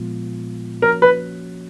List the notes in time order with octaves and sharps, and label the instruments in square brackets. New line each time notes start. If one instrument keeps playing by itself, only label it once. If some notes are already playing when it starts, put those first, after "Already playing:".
Already playing: [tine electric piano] A#2 F3 G#3 B3 F4
[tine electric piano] F3 A#3 C#4 F#4 C#5 [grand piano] A#4
[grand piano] B4